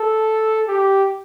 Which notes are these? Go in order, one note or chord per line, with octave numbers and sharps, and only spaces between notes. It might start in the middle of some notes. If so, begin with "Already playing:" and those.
Already playing: A4
G4